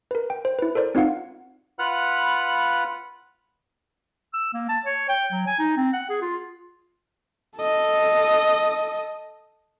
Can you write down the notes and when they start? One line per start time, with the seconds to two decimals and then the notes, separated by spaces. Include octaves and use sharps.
0.11 A#4 B4
0.30 G5
0.45 C5
0.59 E4 B4
0.75 A4 A#4 C5 D5
0.95 C4 D#4 F4 F5 F#5
1.79 F4 B4 F#5 B5 F6 F#6
4.34 E6
4.54 A#3
4.69 A5
4.86 C#5
5.09 G5
5.32 F#3
5.47 G#5
5.59 D#4
5.77 C4
5.93 F#5
6.10 G#4
6.22 F4
7.57 A4 D#5